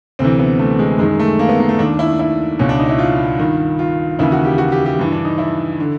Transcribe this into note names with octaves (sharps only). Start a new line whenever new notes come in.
D2 C3 E3 C4
B3
A3
G#3
F#2 D#3 G#3
A3
A#3
B3
A#3
A3
D#2 D#3 D4
E4
E4
C#2 B2 C#4
D4
D#4
E4
F4
G2 D#3
F4
D#2 C#3 E3 E4
F#4
G4
F#4
G4
G4
G2 E3
D4
D#4
E4
D3